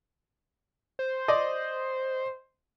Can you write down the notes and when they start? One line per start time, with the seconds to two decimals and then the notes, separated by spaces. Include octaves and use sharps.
0.99 C5
1.28 D5 D#5